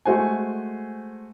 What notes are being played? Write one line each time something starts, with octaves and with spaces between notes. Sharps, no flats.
G#3 A3 F#4 C5 G#5